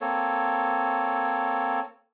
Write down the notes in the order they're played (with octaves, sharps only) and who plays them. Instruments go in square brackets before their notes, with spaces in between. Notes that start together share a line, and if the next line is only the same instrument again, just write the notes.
[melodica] A#3 C4 A4 C#5